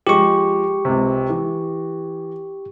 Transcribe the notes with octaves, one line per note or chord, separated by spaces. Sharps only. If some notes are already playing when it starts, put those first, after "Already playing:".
F3 G#3 G4 C#6
C#2 C3
E3